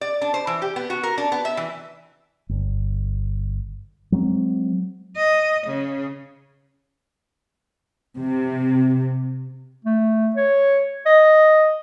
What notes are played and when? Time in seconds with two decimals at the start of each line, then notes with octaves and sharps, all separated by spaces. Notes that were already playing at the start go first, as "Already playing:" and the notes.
0.01 D5
0.21 D4
0.34 C5
0.47 E3
0.62 G4
0.76 B3
0.90 F#4
1.03 A#4
1.18 D4
1.32 B3
1.45 E5
1.57 E3
2.49 G1
4.12 F#3 G#3 B3 C4
5.17 D#5
5.67 C#3
8.19 C3
9.85 A3
10.36 C#5
11.06 D#5